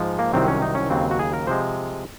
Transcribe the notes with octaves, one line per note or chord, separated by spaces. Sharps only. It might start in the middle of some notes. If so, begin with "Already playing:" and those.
Already playing: G#2 F3 G#3
A#3
C2 C3 D#3 F#3 C4
C#4
D#4
C#4
D#2 C#3 F#3 C4
F#4
G#4
A#4
C3 F3 G#3 C5